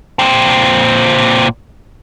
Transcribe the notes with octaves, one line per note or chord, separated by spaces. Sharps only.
A#2 C4